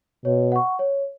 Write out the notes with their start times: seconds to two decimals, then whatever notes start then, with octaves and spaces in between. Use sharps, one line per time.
0.25 B2 C#5
0.52 F#5 C#6
0.79 C#5